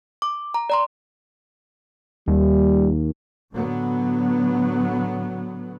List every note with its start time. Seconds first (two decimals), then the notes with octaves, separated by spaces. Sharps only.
0.22 D6
0.54 A#5
0.70 D5 A#5 C6
2.28 D#2 G3
3.53 A2 D3 F#3 B3